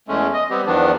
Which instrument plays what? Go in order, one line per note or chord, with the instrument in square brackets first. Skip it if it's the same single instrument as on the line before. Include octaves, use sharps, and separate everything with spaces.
[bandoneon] E2 G#3 A3 C#4
D#5
G3 B3 C4 G4
E2 D#3 F3 B3 D4